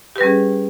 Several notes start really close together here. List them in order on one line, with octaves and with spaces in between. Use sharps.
G4 B4 G3 C#4 G#4